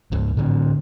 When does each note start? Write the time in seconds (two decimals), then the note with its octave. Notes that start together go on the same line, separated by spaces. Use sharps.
0.12 C#2 G#2
0.37 A2 D3 C#4